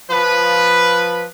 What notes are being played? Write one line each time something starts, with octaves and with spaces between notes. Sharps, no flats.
F3 B4